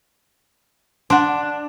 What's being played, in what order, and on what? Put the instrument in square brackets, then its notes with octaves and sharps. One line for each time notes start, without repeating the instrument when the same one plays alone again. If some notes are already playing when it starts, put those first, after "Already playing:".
[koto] D4 [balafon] F#5 C6